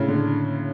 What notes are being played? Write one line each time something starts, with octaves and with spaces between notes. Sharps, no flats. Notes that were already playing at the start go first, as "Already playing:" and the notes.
Already playing: A2 C#3
D3